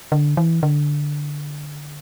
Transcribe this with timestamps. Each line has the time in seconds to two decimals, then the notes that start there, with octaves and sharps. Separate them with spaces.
0.12 D3
0.37 E3
0.63 D3